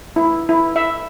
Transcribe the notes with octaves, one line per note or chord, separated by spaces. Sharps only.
E4
E4
E5